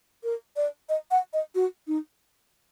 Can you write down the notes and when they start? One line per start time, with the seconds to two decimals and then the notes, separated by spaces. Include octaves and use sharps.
0.24 A#4
0.56 D5
0.89 D#5
1.11 F#5
1.33 D#5
1.55 F#4
1.87 D#4